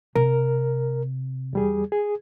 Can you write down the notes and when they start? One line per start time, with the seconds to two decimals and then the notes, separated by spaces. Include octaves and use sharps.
0.16 C3 A#4
1.53 E2 G3 G#4
1.92 G#4